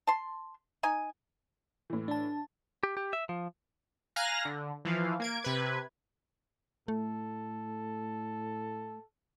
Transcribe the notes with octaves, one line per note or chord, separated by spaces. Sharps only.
A5 C6
D#4 G#5
A2 E3
D4 A5
G4
G4
E5
F3
F5 G#5 A#5 F6 F#6 A#6
D3
E3 F3 F5
A#3 G#6 D7
C3 B4 G#6
A2 A3 A4